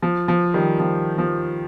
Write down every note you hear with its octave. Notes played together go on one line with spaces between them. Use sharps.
F3
F3
D#3 G3
F3
F3